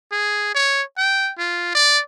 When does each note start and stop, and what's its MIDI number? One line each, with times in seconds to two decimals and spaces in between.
0.12 0.51 68
0.54 0.82 73
0.97 1.31 79
1.38 1.74 65
1.75 2.00 74